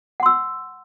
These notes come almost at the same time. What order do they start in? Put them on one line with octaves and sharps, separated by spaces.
F#5 C6 E6